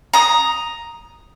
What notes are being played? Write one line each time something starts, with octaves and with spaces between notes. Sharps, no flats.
A#5 D#6